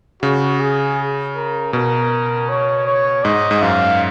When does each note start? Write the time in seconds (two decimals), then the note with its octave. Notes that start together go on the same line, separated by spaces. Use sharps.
0.22 C#3 F#4
0.60 G#4
1.36 A#4
1.73 B2 A#4
2.49 C#5
2.87 C#5
3.25 G#2 D#5
3.51 G#2
3.62 F#2 F5